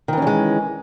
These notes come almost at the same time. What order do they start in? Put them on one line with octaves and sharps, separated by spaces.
D#3 E3 C#4 G3 G#3